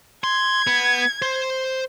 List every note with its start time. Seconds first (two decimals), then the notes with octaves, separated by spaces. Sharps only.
0.24 C6 G#6
0.67 B3
1.22 C5